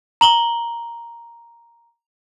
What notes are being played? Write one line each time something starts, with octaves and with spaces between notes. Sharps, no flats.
A#5 F#7 G7